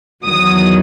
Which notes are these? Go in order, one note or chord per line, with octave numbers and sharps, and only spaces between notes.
E2 D#3 F#3 D#6